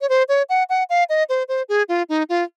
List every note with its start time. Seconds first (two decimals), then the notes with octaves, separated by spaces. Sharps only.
0.01 C#5
0.09 C5
0.29 C#5
0.49 F#5
0.70 F#5
0.90 F5
1.09 D#5
1.29 C5
1.48 C5
1.69 G#4
1.89 F4
2.09 D#4
2.29 F4